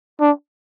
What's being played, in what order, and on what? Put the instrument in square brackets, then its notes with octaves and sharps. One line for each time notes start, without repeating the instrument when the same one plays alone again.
[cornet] D4